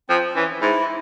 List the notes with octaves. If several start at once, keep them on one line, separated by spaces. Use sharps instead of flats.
F3 C4
E3 C#4
G#2 E4